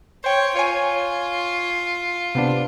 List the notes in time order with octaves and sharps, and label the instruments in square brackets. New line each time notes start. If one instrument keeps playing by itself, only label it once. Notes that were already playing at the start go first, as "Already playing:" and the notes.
[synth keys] C5 G5 [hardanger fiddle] C#5
[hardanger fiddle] F4 [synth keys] C#5 G#5
[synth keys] C3 B3 D4